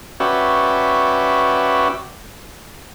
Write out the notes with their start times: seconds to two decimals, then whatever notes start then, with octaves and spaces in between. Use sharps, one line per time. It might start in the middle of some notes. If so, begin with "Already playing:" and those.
0.20 C#4 F#4 B4 D5 E5 G5